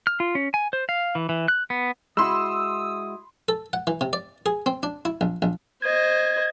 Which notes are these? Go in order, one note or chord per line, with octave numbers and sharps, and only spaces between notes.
F6
F4
C#4
G#5
C5
F5
E3
E3
F#6
B3
G#3 E4 F#4 B5 C6 D#6 E6
A4
F#5
E3
C3
D5
G#4
C4
D4
E4
A#1
A#1
C5 D#5 G#6